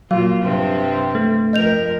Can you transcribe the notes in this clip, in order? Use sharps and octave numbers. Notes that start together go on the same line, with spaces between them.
A#2 F#3 F4 F5
G2 C3 C4
A3
F2 A#4 D#5 G6 F7